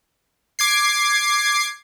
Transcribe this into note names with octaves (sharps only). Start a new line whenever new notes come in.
D6 G#6 C7